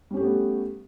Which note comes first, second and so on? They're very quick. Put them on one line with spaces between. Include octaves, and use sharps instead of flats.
G3 C#4 G4 A3 B3